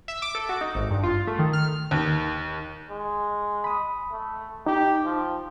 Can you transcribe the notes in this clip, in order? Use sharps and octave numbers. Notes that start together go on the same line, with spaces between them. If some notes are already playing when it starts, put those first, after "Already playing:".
E5
D6
A4
F#4
D#4
G#1
G2
F4
A3
D#3
F6
D#2
G#3
B5 D#6
A3
D#4 G4
F3